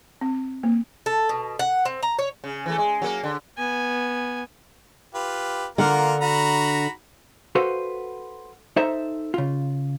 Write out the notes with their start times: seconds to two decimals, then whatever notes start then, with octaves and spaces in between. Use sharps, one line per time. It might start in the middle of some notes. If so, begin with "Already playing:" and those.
0.21 C4
0.63 A#3
1.06 A4
1.29 B2
1.59 F#5
1.85 C4
2.03 A#5
2.19 C#5
2.44 C#3
2.66 E3 A3
2.78 G#3
3.02 F#3 A#3
3.24 D3
3.58 B3 G#5
5.14 F4 G4 B4
5.78 D3 A#3 F4 A#4 F#5
6.21 F#4 A#5 B5
7.55 F#4 A4 B4 C5 F5 F#5
8.76 D#4 A4 C5 E5 A5 A#5
9.34 C#3 F4